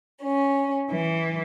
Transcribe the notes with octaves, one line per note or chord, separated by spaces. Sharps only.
C#4
E3